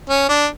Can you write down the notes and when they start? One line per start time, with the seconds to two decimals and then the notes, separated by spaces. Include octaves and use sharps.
0.09 C#4
0.29 D4